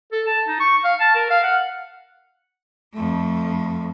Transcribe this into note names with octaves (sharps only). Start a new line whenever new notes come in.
A4
A5
D#4
C#6
F5
A5
A#4
F5
F#5
F2 A3